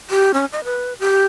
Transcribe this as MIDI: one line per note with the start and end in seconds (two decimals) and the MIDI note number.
0.10 0.32 67
0.34 0.45 61
0.53 0.60 75
0.65 0.94 71
0.99 1.26 67